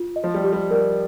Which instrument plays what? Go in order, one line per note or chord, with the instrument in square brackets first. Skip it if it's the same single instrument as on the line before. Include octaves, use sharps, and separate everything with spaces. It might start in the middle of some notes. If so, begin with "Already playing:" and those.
Already playing: [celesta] F4
D#5
[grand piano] F3
G3
[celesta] G4
[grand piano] G3
[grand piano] G3 [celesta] A#4